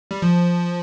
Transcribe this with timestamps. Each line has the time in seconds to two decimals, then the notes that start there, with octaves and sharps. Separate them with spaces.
0.11 G3
0.22 F3